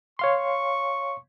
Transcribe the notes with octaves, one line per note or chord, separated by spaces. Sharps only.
C#5 F5 C6 C#6